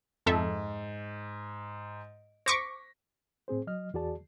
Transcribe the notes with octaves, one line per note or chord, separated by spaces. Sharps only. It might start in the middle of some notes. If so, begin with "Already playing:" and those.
F2 G#2 A4 E5
C5 C#6 D6 A#6 B6
A2 C4 G#4 C5
F#3 D#5 F6
E2 F#4 G#4 D5 A5